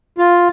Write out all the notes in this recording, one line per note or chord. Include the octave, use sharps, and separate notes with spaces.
F4